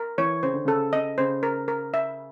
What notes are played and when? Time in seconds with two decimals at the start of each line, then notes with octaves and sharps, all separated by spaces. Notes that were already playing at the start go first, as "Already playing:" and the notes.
Already playing: A#4
0.18 E3 C#5
0.43 C#3 C5
0.54 D3
0.65 C#3 A4
0.93 C#3 D#5
1.18 C#3 C5
1.43 A#4
1.68 A#4
1.94 E5